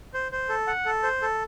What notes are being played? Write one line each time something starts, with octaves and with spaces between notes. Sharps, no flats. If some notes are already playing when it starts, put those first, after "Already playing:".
C5
C5
A4
F#5
A4
C5
A4